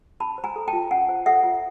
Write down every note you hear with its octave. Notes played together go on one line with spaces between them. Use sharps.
C#4 A5 B5
C5
G#5 A#5
A4
G5 A5
F4
C#4 F#5 G#5
C5
A4 E5 F#5
F4